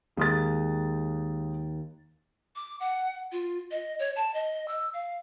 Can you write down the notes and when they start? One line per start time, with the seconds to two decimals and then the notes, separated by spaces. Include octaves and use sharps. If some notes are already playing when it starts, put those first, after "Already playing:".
0.17 D#2 G#3 D#6 A6
2.56 D6
2.80 F#5
3.32 F4
3.71 D#5
3.99 C#5
4.16 A5
4.34 D#5
4.68 E6
4.94 F5